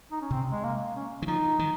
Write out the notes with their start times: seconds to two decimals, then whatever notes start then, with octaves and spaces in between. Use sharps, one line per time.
0.12 D#4
0.21 C#4
0.31 C3 C4
0.51 G#3
0.64 A#3
0.96 C#4
1.22 D#3
1.27 F3 D#4
1.59 D#3